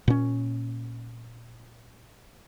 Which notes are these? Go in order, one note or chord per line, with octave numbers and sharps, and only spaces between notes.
A#2 C#4